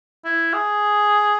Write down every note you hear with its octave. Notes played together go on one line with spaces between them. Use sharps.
E4
G#4